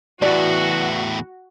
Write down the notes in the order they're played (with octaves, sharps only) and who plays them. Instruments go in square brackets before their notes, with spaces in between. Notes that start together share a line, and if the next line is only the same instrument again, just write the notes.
[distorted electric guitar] E2 A2 [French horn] E3 [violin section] F#4 [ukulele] D5